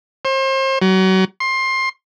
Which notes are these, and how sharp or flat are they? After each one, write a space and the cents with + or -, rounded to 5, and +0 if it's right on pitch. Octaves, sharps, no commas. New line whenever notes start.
C5 +35
F#3 +30
C6 +20